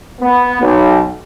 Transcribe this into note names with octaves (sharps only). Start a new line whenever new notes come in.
B3
B1